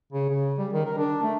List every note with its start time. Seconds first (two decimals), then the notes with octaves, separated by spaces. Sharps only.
0.13 C#3
0.30 C#3
0.58 G3
0.73 D#3
0.86 A#4
0.98 D4
1.23 A3